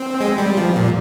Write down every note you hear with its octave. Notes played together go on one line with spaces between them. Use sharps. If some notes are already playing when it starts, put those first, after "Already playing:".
Already playing: C4
G#3
G3
F3
A#2